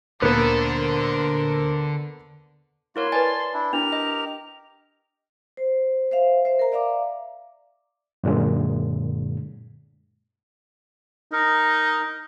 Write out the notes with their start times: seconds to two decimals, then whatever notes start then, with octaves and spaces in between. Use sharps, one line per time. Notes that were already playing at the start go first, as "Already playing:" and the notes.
0.22 D2 A#2 D3 A#3 B3 A4 A#4 C5
2.96 A#3 E4 F#4 A#4 C#5 C6
3.12 B4 D5 G#5 A5 A6
3.53 D4 E4
3.73 D4 E4 G4 A#4 F7
3.92 D#5
5.57 C5
6.11 C5 E5 F5
6.45 C5 E5
6.59 A#4 A#5
6.72 D5 E5 F5 A#5 D6
8.24 F#2 A#2 D3 G#3
11.32 D#4 A#4